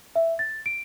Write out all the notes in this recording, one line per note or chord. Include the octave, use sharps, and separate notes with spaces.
E5
A6
D7